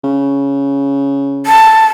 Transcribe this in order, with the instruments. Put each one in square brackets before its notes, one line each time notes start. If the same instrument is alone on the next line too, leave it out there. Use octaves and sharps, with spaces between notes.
[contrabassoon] C#3
[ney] A5